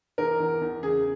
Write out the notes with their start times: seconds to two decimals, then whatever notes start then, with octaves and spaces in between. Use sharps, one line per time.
0.18 E2 A#4
0.39 E2
0.61 E2
0.83 C#3 G#4